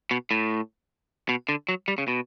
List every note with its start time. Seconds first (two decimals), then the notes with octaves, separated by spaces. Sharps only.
0.11 B2
0.31 A2
1.29 B2
1.49 D3
1.69 F#3
1.88 G3
1.98 C#3
2.08 B2